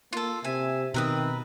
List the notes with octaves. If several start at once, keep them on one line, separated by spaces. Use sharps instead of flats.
A#3 F4 A4
C3 E5 G#5
B2 D#3 C4 A#4 B4 D#6